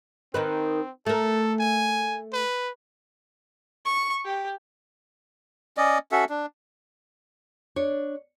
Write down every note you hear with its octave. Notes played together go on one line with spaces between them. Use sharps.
D#3 C4 D#4 B4
A3 A4 A#4
G#5
B4
C#6
G4
C#4 D5 D#5
C#4 F#4 A4 E5
D4
D4 C#5